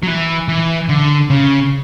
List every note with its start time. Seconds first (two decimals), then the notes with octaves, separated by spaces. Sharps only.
0.03 F#3
0.08 E3
0.48 E3
0.89 D3
1.30 C#3